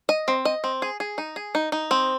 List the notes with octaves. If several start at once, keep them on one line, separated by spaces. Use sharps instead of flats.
D#5
C4
D#5
C4
G#4
G#4
D#4
G#4
D#4
D#4
C4